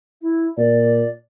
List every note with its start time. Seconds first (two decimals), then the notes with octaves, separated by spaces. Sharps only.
0.22 E4
0.57 A#2 D5